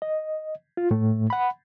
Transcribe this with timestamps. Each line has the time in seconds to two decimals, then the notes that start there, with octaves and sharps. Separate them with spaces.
0.02 D#5
0.77 F4
0.91 A2 A3
1.30 F#5 B5